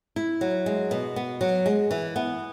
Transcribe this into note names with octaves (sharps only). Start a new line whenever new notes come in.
E4
F#3
G#3
B2
B3
F#3
G#3
E3
B3